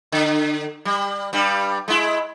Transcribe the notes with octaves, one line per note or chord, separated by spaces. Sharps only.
D3
G3
G2 G3
G#3 E4